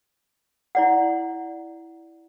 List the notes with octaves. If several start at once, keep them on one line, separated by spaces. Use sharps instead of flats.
E4 D5 F#5